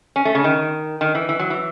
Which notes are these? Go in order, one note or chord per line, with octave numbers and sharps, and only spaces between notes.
C#4
A3
C#3
D#3
D#3
E3
E3
F#3
E3